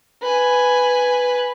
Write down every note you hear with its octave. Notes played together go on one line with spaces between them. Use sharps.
B4 G#5